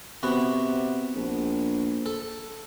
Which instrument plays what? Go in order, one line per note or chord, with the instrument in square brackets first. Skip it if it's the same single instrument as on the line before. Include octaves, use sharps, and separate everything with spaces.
[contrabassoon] C3 [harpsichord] B3 F#4
[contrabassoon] A#1
[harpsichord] A4